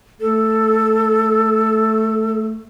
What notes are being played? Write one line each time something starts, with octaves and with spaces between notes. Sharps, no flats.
A3 A4